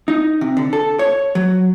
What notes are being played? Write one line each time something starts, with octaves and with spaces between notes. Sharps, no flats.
D#4
C3
D3
A4
C#5
F#3